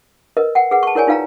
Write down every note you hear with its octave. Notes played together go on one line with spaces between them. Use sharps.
A#4 B4 D#5
F#5 G5
G#4 B4 F#5
A5 C#6
E4 A#4 C#5 D5 G#5
D#4 F4 B4 F5 G5 A#5